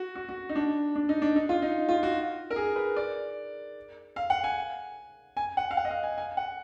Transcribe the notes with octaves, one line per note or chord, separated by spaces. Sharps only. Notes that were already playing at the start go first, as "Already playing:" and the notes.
Already playing: F#4
F#4
F#4
D#4
D4
D4
D#4
D4
D#4
F4
D#4
F4
F#4
A#4
G#4
B4
D5
F5
F#5
G#5
G#5
F#5
F5
F#5
D#5
F5
G#5
G#5
F#5